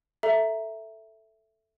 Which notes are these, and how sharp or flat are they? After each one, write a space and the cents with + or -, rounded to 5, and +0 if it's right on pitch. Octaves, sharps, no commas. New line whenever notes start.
A4 +0 E5 +0 A#5 +0